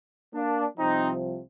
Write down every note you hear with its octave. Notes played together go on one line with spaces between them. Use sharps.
A#3 D4
C2 C3 F3 C4 D#4